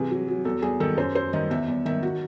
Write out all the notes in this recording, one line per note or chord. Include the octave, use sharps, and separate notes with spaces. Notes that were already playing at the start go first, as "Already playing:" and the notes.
Already playing: C3 E3 G#4
F#3
F#3
E2 A4
E2 G#4
D#3 A4
F#2 C5
F#2 C5
D#3 D#5
E2 E5
E2
D#3 E5
F#4